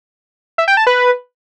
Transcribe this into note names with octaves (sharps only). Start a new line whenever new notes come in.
E5
G5
A5
B4